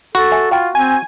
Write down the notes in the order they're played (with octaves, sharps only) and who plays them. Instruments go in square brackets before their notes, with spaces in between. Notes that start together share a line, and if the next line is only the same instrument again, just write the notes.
[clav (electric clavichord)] F#4 [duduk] A4 [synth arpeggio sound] B5
[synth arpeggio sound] E5 G#5
[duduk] F4 [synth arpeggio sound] F5 G5 B5
[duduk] C4 [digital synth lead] G#5